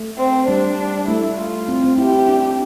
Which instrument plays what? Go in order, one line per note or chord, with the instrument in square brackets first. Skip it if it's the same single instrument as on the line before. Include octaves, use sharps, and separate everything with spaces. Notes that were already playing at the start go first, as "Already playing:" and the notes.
Already playing: [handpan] A3
[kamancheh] C4
[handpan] G3 [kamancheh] D4
[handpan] A3 [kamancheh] E4
[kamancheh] F4
[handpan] C4
C4
[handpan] E4 [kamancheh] G4
[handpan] D4